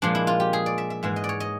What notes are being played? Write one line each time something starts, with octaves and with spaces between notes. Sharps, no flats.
A#2 F3 G#3 D4
E4
F4
G4
G#4
D5
E5
E5
G#2 E3 G#3 E5
D#5
D5
C#5
D#5